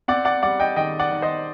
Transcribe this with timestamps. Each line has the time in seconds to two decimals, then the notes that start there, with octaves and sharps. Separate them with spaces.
0.08 C4 D5 F#5
0.25 D5 F#5
0.43 G3 D5 F#5
0.60 D#5 G5
0.76 D#3 D#5 G5
0.99 D5 F#5
1.12 D#3
1.22 C5 D#5